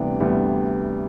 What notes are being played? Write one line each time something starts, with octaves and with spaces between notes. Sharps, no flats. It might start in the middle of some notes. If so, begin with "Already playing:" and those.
Already playing: D2 C3 E3 G3 B3 D5
D2 C3 E3 G3 B3